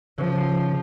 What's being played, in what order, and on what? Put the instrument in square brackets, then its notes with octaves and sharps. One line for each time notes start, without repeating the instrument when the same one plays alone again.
[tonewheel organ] C#3 [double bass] F3